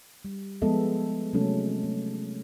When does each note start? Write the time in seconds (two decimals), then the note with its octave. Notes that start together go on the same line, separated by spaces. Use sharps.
0.25 G3
0.62 F3 G#3 B3 A4 D#5 E5
1.33 C3 F#3 G#3 A3 C#4 A4
1.83 A3